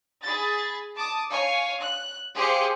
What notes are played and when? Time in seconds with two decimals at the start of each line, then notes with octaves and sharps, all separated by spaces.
0.22 G#4 B5 A6
0.96 A5 D6 D#6
1.31 C#5 F5 G#5 C#6
1.81 F#6
2.35 G4 G#4 C5 F5 C#7